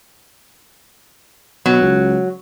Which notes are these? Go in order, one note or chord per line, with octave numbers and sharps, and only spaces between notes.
B2 F#3
C#2